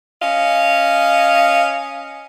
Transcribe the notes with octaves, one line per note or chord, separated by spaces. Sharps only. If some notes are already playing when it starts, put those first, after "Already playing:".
C#4 D#5 F5